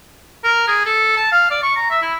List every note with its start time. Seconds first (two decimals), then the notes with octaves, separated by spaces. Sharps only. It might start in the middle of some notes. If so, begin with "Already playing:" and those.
0.44 A#4
0.67 G#4
0.85 A4
1.16 A5
1.32 F5
1.50 D5
1.63 C#6
1.76 A#5
1.90 E5
2.02 E4